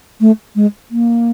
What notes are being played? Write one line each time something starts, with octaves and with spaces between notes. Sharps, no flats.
A3
G#3
A#3